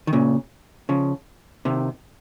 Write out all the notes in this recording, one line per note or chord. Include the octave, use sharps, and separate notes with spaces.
D#3
A#2 C#3
C#3 F3
C3 D#3